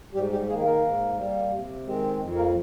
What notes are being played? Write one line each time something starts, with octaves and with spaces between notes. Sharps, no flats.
G#2 G3 G4
G3 G4
D#3 G#3 A#3 G#4
A#3 A#4
G#2
G3 A#3
C3
D#3 G#3 C4
F2
A#3 A#4